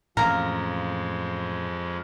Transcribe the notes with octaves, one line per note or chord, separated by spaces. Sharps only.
F2 A2 E3 F3 G#3 A#3 C#4 A#4